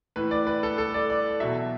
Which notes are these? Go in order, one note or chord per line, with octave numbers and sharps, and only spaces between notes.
A2 E3 B4
D5
B4
A4
A4
D5
D5
E2 B2 F#3 E5